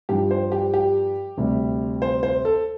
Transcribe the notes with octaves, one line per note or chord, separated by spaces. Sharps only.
G2 F3 G4
C5
G4
G4
D2 C3 G3
C5
C5
A4